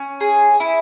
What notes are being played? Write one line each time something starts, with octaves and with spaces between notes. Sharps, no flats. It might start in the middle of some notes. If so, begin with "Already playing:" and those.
Already playing: C#4
G#4
E4